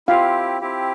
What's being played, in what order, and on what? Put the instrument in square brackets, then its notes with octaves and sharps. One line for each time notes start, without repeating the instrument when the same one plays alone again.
[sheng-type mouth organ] C4 E4 G4 [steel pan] F4 F5
[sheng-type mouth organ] C4 E4 G4